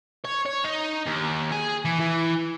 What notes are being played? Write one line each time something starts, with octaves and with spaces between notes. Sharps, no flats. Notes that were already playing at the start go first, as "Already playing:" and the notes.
C#5
C#5
D#4
D#2
G#4
E3
E3